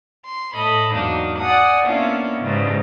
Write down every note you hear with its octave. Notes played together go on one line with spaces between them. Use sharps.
C6
A2 A4 D#5 B5
E2 G#2 F#3 A#3 D4 D#4
D5 F#5 G#5 D#6
A#3 B3 C#4 D4 E4 F4
G#2 C#3 E3 G3